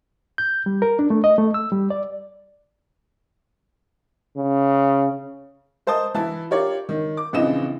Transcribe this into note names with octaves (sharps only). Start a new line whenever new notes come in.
G6
G3
A#4
D4
A3
D#5
A3
E6
G3
D5
C#3
A#4 C5 D#5 A5 D#6
E3 E4 A5
F4 G4 A#4 C#5 D5
D#3
D6
A#1 C#3 E3 C4 D#5 E7